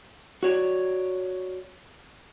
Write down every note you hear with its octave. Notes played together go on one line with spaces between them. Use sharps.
F#4 C#5 D5